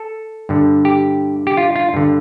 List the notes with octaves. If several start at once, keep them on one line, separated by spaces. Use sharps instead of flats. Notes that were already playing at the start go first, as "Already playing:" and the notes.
Already playing: A4
G2 D3
G4
G4
F4
F4
G2 D3